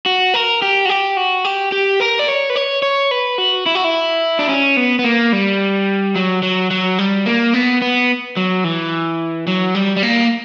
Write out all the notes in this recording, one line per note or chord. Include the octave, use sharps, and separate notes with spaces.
F#4
A#4
G4
F#4
G4
F#4
G4
G4
A#4
D5
C#5
B4
C#5
C#5
B4
F#4
E4
F#4
E4
D4
C#4
B3
B3
A#3
G3
F#3
F#3
F#3
G3
A#3
B3
B3
F#3
E3
F#3
G3
G3
A#3